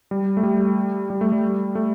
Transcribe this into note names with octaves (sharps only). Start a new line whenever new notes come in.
G3
A3
G3
G3
A3
G3
A3